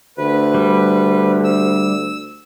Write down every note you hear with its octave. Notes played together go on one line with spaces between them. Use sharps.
D2 B4
G3
E6